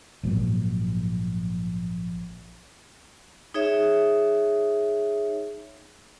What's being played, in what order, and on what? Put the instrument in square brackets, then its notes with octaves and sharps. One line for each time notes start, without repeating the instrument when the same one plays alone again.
[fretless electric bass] A#1 G#2 F#3 A#3
[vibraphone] D#4 G#4 C#5 E5